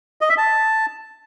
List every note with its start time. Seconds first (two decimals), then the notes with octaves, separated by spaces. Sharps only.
0.21 D#5
0.29 E5
0.38 A5